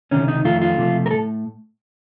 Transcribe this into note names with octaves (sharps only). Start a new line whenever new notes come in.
C#2 C3 D#3 C#4
D#4
F2 D#3 A3 F4
F4
C#2 C3 F3 A3
A#4
A2 A3 A4